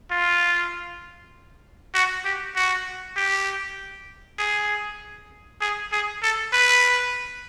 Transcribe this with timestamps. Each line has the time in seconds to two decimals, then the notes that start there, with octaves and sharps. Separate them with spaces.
0.11 F4
1.94 F#4
2.25 G4
2.56 F#4
3.16 G4
4.39 G#4
5.61 G#4
5.92 G#4
6.22 A4
6.53 B4